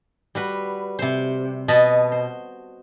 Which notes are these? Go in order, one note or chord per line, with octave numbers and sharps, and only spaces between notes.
G3 F#4 B4
C3 C5
B2 F#4 B4 D#5 A5 B5
C5